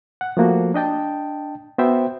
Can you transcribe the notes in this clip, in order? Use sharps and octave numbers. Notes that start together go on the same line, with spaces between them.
F#5
F3 A3 A#3 F#4
D4 D#5 G5 A5
B3 F#4 C5 E5 G5